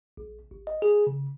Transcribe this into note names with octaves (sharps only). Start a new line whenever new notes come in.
A#1
A1
D#5
G#4
C#3